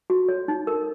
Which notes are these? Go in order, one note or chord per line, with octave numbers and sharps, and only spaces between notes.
F#4
C#5
D#4
A#4